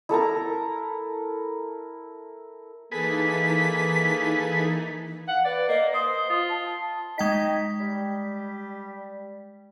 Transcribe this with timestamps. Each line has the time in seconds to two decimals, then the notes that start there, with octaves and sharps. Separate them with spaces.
0.09 E4 A4 A#4 A#5
2.91 E3 A#3 D#4 G#4 A4 B4 B6
5.28 F5 F#5
5.45 B4 D5
5.69 A#3 D#5
5.94 C5 D#6
6.30 F4
6.50 A5
7.18 G#3 D#4 G5 B6
7.80 G3